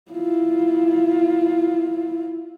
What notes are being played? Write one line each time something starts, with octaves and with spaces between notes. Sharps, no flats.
E4 F4